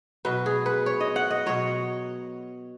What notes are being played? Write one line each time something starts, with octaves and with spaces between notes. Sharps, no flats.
B2 F#3 B4
G#4
B4
C#5
D#5
F#5
D#5
B2 F#3 C#5